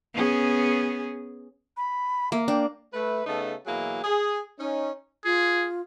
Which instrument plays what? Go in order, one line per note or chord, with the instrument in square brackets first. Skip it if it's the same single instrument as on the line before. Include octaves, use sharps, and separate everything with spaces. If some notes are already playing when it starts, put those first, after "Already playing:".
[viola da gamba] B3 C#4 G#4
[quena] B5
[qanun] A#3 [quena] E5
[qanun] D4 [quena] G5
[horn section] A3 B4
C#3 A3 B3 D#4 A4
B2 E3 F#3 A#3 E4 G#4
G#4
C#4 D#4
[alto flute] F4 [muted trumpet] G#4